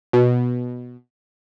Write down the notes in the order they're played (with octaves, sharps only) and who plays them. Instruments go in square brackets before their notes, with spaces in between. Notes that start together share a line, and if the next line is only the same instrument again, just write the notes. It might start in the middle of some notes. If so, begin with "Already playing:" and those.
[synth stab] B2